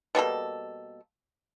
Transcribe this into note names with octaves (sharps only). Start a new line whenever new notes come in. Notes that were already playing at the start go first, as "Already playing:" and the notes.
B2 G3 A#3 A4